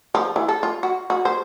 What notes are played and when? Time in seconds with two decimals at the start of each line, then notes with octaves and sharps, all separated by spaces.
0.15 F3
0.36 E3
0.49 A4
0.63 F4
0.83 F#4
1.10 F#4
1.25 C5